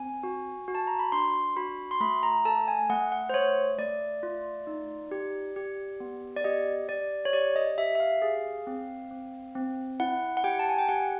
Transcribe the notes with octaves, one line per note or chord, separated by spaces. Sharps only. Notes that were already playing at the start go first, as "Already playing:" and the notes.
Already playing: C4 G#5
F#4
F#4
A5
A#5
B5
D4 C6
F#4 B5
C6
A3 B5
A#5
A4 A5
G#5
A3 F#5
F#5
C5
A3 C#5
A3 D5
F4
D#4
G4
G4
B3
D5
G4 D#5
G4 D5
C#5
G4 D5
D#5
G4 E5
E5
F5
G#4
C4
C4
C4
E4 F#5
F#5
G4 G5
A5
G#5
G5
G4 F#5